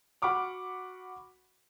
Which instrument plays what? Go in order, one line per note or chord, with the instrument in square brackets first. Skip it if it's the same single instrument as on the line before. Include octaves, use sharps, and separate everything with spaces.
[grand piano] F#4 F#5 B5 C#6 D6 F6